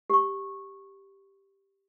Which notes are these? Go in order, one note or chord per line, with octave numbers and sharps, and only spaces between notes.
G4 C#6